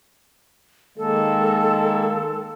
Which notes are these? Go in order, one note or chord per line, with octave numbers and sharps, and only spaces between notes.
D#3 G#3 A#3 A4